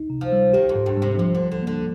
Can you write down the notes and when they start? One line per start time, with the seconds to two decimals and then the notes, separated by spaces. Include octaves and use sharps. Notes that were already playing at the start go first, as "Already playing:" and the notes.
Already playing: D#4
0.10 C3
0.21 F3
0.32 G3
0.54 D#3 G4
0.69 F2
0.76 G#2
0.86 G2
0.97 G3
1.02 C3
1.19 C3 F3
1.35 D3
1.40 F3
1.52 D3
1.62 D3 A#3